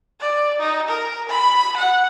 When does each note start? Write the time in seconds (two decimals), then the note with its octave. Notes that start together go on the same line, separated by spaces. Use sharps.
0.20 D5
0.60 D#4
0.89 A#4
1.29 B5
1.77 F#5